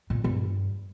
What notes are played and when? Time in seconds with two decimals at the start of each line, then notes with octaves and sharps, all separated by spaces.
0.10 A#2
0.24 G2